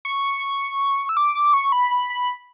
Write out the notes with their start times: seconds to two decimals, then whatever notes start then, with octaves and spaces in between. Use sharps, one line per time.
0.05 C#6
1.09 E6
1.17 D6
1.35 D6
1.53 C#6
1.72 B5
1.91 B5
2.10 B5